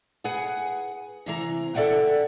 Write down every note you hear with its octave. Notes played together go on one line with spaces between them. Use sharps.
G#4 B4 F#5 G#5
C3 E3 A#5
A4 D5 E5 F#5 G5